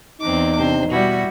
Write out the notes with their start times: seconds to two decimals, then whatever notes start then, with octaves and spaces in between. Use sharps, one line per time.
0.21 E2 C4 D#4 D6
0.59 C3 C4 D4 C5
0.91 B2 G3 E4 F#4